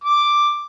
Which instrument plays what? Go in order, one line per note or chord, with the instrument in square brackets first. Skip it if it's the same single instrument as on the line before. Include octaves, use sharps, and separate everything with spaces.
[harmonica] D6